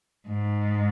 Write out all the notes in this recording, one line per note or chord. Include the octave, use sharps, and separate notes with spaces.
G#2